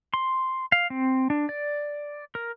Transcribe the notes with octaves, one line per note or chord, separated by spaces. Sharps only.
C6
F5
C4
D4
D5
A#4